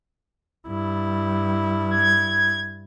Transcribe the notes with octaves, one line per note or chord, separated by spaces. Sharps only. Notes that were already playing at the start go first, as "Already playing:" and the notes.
G2 E4
G#6